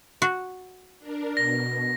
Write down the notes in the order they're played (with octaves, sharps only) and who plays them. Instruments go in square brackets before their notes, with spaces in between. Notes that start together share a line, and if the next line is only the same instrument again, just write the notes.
[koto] F#4
[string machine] D4 A#4
[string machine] B2 [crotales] A#6